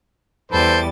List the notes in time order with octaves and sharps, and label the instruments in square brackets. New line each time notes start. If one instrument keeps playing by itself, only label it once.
[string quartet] E2 G3 A6 [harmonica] A4 B4 C5